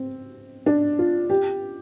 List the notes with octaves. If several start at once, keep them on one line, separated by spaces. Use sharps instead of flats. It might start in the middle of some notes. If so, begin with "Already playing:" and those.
Already playing: C4
D4
F4
G4